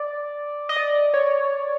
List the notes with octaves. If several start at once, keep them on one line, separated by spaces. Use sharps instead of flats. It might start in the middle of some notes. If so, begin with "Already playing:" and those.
Already playing: D5
D#5
D5
C#5